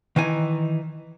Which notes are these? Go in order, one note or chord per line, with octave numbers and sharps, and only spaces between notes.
D#3 E3 D#4 G#5